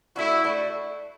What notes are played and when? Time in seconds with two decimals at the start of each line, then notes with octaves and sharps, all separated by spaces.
0.16 A3 D4 E4 F#4
0.44 A3 D4 F#4